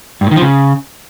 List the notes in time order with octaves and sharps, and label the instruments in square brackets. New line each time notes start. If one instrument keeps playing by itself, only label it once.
[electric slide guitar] G2
A2
D#3
F3
C#3